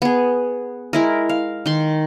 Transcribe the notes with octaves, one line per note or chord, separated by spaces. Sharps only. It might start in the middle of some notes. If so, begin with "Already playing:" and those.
B3 G#4
G#3 E4 A#4
F5
D#3 C6